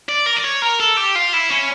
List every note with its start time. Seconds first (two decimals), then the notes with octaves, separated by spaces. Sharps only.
0.09 D5
0.26 A#4
0.37 D5
0.44 C#5
0.62 A#4
0.80 A4
0.97 G4
1.15 F4
1.33 E4
1.50 C#4